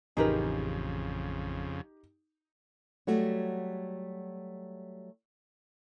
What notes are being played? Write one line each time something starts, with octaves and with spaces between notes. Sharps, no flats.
A1 F2 C#3 D#4 G4 G#4 A#4 B4
F#3 G3 A3 F#4